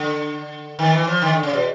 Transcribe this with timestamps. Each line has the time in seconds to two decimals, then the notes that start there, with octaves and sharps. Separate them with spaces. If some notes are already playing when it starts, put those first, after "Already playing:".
Already playing: D3
0.79 D#3
0.94 E3
1.07 F3
1.22 D#3
1.33 D3
1.43 C#3
1.53 B2